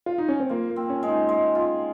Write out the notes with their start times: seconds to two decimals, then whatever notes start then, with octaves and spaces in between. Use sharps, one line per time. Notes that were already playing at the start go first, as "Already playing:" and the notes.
0.06 F4
0.18 D#4
0.28 C#4
0.40 C4
0.49 A#3 F4
0.70 A#3
0.76 C4
0.90 C#4
1.03 G#3
1.08 D#4
1.29 G#3
1.55 F4